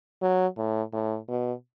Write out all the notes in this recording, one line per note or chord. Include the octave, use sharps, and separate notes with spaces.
F#3
A2
A2
B2